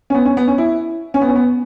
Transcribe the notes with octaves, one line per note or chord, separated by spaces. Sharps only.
C#4
B3
C#4
B3
C#4
E4
C#4
B3
C#4
B3